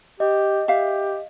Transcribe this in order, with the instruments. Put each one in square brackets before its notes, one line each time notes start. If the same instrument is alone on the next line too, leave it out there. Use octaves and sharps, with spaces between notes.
[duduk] G4 [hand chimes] D#5
[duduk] G4 [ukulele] E5 F5